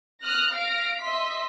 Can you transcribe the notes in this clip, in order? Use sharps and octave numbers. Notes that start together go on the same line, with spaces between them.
D#6 F6 F#6 A#6
F5 F6 A#6 D7
D#5 E5 C6 B6